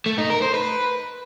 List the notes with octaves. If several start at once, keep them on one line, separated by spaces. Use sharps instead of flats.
A3
D#4
A#4
C5
B4